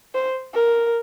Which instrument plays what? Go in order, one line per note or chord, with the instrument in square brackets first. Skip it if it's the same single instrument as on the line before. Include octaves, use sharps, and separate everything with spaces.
[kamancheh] C5
A#4